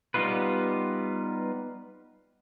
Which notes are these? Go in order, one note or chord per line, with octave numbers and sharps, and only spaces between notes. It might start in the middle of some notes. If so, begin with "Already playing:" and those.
G3 B3 D#4 F4 B4